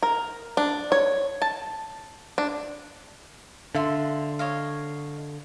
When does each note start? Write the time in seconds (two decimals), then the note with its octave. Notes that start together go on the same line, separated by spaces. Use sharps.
0.03 A#4
0.57 D4
0.92 C#5
1.42 A5
2.38 D4
3.75 D3 F4 E5 C6
4.39 C#5 D#5 F5